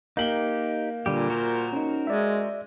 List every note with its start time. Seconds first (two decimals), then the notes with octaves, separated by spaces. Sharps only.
0.17 A#3 D#4 G4 F#7 G7
1.06 A#2 D3 G3 G4
1.30 F#4 A#4 C5
1.73 C#4 D#4
2.07 G#3 D5 E5